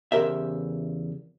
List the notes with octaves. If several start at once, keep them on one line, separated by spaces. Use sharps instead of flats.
E2 C#3 G4 A#4 C5 E5